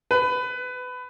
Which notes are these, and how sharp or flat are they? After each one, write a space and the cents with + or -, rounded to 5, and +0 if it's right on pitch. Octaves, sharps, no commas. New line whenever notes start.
B4 +20